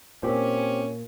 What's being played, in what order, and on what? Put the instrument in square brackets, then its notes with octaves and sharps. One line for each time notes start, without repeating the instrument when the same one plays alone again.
[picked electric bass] A#2 [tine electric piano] C4 G4 C5 [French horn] C#4